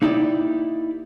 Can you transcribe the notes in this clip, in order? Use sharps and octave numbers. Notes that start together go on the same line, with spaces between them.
A#3 D#4 E4 G4 D5